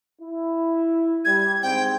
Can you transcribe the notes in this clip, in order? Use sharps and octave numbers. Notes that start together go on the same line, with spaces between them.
E4
G3 G#6
G#2 C4 G5